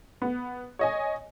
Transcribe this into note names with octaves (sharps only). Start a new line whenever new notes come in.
B3
C#5 D#5 G#5